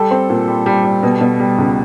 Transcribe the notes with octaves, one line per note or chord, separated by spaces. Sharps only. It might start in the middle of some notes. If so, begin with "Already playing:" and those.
Already playing: G3 A4
C4
A#2
G3
G3
G3
B2
B2
G3
C#2